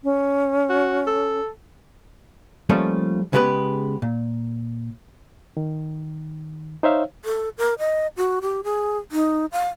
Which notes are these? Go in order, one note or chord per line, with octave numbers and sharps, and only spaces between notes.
C#4
F#4
A4
F3 G3 A3 A#3 C#4 F4
C#3 G#3 B3 G4 B4
A#2
D#3
D#4 C5 C#5 E5 F5
A4
A#4
D#5
F#4
G4
G#4
D#4
F5